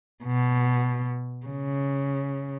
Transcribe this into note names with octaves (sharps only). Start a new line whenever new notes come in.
B2
C#3